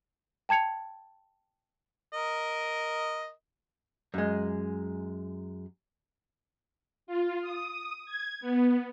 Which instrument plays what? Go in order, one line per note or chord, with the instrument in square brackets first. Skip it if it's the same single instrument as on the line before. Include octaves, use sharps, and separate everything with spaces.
[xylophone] G5 A5 G#6 C#7 F7
[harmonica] A#4 D#5
[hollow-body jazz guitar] F#2 G#3
[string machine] F4
D#6
G#6
B3